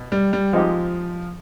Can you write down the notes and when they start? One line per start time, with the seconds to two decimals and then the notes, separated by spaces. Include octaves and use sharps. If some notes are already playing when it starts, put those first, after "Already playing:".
Already playing: B2
0.12 G3
0.33 G3
0.53 F3 G#3 C4 D#4 G4